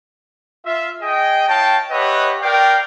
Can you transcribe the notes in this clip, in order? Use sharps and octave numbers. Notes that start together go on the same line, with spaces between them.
F4 E5
G#4 D#5 G5
E4 C#5 F5 G5 A5
G4 B4 C#5 D#5 E5 F#5
A#4 D5 F5 G5